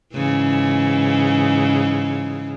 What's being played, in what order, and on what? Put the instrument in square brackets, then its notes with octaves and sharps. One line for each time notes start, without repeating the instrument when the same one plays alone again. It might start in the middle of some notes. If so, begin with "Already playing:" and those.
[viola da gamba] G#2 C#3 E3